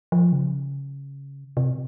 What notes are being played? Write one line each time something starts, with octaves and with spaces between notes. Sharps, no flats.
F3
C#3
C3